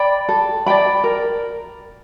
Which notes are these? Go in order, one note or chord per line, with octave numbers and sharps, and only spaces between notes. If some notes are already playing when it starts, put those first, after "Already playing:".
Already playing: D5 G5 B5
A4
D5 G5 B5
A#4